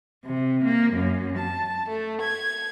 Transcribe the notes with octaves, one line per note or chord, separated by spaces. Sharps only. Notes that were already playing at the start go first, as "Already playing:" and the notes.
C3
A#3
F#2
A5
A3
G#6